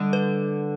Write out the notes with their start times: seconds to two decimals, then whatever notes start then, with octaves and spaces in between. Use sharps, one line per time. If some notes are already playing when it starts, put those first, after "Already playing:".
Already playing: D3 G3
0.13 B4